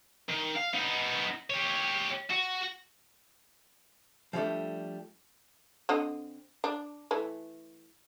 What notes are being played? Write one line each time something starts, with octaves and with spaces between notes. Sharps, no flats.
D#3
F5
B3 D#4
G4 C#5
F#4
F3 G3 A3 D4
D3 C4 D#5
D4
E3 A3